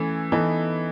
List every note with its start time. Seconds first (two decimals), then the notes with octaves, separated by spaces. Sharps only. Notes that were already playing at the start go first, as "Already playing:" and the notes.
Already playing: E3 A3 C#4
0.32 E3 B3 D#4 A4